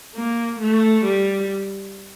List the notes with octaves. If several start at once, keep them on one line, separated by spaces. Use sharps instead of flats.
A#3
A3
G3